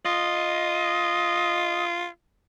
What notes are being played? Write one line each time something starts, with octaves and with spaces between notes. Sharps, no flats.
F4 D#5